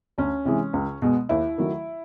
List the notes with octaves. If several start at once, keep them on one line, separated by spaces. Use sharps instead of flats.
D2 C#4
C3 E3 G#3
C#2
B2 G#3 B3
D#2 E4
D#3 F#3 A3